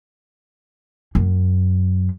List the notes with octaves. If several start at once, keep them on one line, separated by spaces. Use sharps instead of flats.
F#2